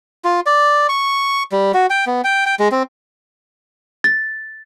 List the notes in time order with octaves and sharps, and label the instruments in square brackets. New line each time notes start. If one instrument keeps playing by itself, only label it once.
[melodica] F4
D5
C#6
G3
F#4
G5
B3
G5
G5
G#3
C4
[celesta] A6